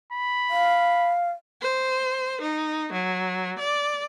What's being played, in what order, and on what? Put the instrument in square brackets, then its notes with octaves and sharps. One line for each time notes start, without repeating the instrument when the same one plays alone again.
[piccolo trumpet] B5
[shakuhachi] F5
[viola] C5
D#4
F#3
D5